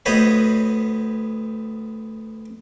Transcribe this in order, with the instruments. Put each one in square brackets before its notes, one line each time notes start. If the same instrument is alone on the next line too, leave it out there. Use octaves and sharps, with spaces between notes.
[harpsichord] D2 B3 C5 C#5 D#5 B5